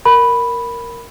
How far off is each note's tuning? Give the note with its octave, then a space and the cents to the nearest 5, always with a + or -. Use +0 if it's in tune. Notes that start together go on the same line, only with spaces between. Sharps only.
A#4 -5 B5 +0